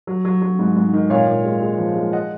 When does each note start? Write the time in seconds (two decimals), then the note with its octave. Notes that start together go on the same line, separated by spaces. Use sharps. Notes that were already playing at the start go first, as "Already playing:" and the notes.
0.07 F#3
0.25 F#3
0.42 F#3
0.59 G#2
0.76 G#2
0.93 D#3
1.10 A#2 C#5 F5
1.27 A#2
1.45 G#3
1.62 G#3
1.78 F3
1.96 G#3
2.13 D#5 F#5